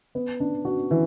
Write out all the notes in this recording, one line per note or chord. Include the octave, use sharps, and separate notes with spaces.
B3
D4
F#4
E3